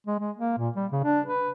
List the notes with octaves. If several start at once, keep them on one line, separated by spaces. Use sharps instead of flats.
G#3
G#3
A#3
A#2
G3
C#3
D4
B4